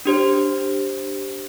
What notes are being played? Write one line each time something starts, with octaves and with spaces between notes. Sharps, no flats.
D4 G4 C5